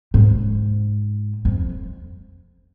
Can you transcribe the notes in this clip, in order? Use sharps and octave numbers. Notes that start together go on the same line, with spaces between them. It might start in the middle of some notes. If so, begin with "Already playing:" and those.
G#2
F2